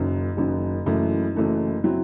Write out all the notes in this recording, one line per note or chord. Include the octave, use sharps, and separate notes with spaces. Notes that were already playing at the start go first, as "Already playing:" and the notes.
Already playing: F#1 F#2 D#3
F#1 F#2 D#3
F#1 F#2 E3 A3 E4
F#1 F#2 E3 A3 E4
F#3 C4 E4